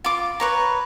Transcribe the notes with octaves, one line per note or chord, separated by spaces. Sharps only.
F4 D6
B4 C#5 A#5